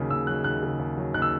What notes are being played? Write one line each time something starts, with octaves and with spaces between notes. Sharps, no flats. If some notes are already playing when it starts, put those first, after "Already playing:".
Already playing: D#2 C#3 F#3
D#2 E6
F#3 F#6
D#2 F#6
C#3
D#2
F#3
D#2 F#6
E6